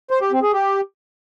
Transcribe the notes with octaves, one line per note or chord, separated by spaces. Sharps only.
C5
G4
C4
G#4
G4